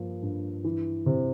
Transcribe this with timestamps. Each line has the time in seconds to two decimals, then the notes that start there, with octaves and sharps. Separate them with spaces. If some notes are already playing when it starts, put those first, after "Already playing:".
Already playing: G2 F3 A#3
0.22 G2
0.64 E3
1.06 C3